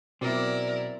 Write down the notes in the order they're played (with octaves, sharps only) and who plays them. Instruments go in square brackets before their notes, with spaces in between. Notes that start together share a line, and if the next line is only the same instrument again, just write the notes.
[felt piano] B2 [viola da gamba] F#3 E4 A#4 [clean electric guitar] C4 [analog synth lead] D5